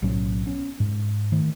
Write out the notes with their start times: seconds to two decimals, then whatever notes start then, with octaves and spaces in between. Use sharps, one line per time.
0.02 B1 A2 F#3 C#4
0.46 B3 C#4
0.80 G#2
1.32 D#3 A3